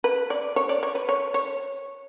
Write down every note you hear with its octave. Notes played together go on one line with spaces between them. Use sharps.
B4
D5
C#5
D5
C#5
B4
C#5
C#5